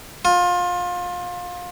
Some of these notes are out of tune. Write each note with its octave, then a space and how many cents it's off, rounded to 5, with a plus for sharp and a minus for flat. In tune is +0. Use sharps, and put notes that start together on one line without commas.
F4 +25